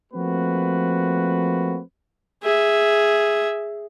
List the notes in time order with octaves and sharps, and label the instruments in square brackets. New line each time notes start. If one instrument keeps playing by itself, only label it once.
[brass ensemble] F3 A3 A#3 C4 F#4 B4
[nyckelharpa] G#4 E5